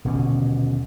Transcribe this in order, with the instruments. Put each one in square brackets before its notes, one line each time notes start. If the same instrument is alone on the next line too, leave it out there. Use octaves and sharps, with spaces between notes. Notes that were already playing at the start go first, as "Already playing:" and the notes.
[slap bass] D#1 B2 D3 C#4